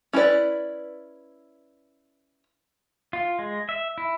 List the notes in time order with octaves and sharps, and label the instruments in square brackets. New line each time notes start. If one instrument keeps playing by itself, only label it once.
[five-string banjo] C#4 E4 F#4 B4 D5
[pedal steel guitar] F4
G#3
E5
E4